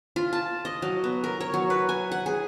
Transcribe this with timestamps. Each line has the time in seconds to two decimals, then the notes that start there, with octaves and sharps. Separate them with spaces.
0.16 F4
0.33 A5
0.65 D#5
0.82 F#3
1.04 B3
1.24 A#4
1.40 C#5
1.54 F#3
1.70 B4
1.89 G#5
2.12 F#5
2.26 G#4